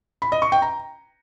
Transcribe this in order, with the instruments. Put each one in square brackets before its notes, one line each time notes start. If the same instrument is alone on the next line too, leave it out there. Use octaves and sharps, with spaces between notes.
[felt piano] B5
D#5
C#6
G5
A#5